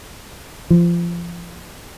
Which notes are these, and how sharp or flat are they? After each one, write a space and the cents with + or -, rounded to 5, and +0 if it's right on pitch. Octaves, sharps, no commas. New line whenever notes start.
F3 -25